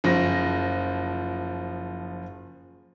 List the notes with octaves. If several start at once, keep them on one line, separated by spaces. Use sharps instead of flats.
F#1 F3 A#6